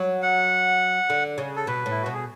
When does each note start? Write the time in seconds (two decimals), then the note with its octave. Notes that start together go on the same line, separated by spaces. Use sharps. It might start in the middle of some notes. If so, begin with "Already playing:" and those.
Already playing: F#3
0.22 F#5
1.10 D3
1.38 C#3
1.56 A4
1.67 B2 B4
1.86 A2
1.91 E4
2.02 B2 F#4
2.13 G#4